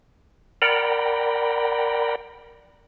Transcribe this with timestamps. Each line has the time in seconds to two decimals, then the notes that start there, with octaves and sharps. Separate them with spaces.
0.62 A#4 D5 F#5 G5 A#5 B5